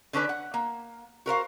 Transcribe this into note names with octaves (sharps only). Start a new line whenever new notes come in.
D3 C#4 D4 B4
F#5
A#3
F#4 A#4 C5 F5